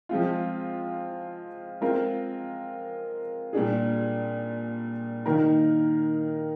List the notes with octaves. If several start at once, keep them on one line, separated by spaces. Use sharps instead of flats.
F3 G#3 C4 F4
G#3 C4 F4 A#4
A#2 G3 D4 G#4
D#3 A#3 D#4 A#4